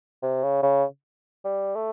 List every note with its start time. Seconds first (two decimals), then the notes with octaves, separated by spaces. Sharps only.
0.22 C3
0.43 C#3
0.63 C#3
1.45 G3
1.75 A3